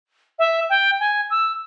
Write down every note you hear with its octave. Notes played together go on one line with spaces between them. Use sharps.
E5
G5
G#5
E6